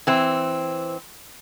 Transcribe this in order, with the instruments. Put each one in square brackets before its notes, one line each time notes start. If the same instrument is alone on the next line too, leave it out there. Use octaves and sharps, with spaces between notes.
[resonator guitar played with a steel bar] E3 C4